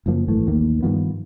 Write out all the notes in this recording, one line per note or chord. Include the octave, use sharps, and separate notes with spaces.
F#1 F#2 F3 A#3
G#1 E3 A3
A1 D#2 D#3 A#3
G2 D#3 F3 B3